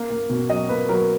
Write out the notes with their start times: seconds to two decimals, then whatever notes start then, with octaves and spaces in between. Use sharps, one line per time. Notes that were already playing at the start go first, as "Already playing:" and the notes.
Already playing: A#3
0.10 A#3
0.30 B2
0.49 F#3 D#5
0.69 A#3 B4
0.89 F#3 A#4